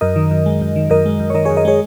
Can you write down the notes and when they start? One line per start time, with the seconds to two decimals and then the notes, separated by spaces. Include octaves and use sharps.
0.01 F#2 A#4 D#5
0.16 D#3
0.31 F#2
0.46 G#3
0.61 F#2
0.76 D#3
0.90 F#2 A#4 D#5
1.06 G#3
1.19 F#2
1.30 C#5
1.34 D#3 A#4 D#5
1.45 G#4 C#5
1.50 F#2
1.57 A#4 D#5
1.65 G#3 G#4 C#5